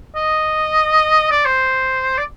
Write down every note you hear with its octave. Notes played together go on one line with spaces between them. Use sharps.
D#5
D5
C5
D5